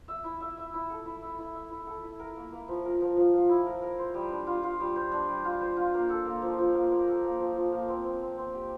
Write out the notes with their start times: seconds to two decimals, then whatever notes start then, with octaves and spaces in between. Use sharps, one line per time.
0.08 E5
0.24 E4
0.40 E5
0.57 E5
0.74 E4
0.90 A4
1.05 E4
1.22 E5
1.38 E4
1.54 E5
1.70 E4
1.87 A4
2.03 E4
2.19 A#4
2.36 A#3
2.52 A#3
2.68 F3
2.85 A#4
3.01 F3
3.17 F3
3.33 F3
3.49 E4
3.66 A#4
3.82 A#4
3.98 C5
4.14 G3
4.31 D4
4.47 F4
4.63 F4
4.80 G3
4.96 C5
5.12 D4
5.28 G3
5.44 F4
5.61 C5
5.77 F4
5.94 A#3
6.09 A4
6.25 A#3
6.42 F3
6.58 F3
6.74 A#3
6.91 A#3
7.08 A4
7.24 A#3
7.39 F3
7.56 F3
7.72 A#3
7.88 C4
8.04 C4
8.21 C4
8.37 C4
8.54 G4